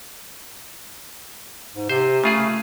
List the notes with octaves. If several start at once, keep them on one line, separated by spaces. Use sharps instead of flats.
G#2
C3 C5
C#3 A3 F4 G#4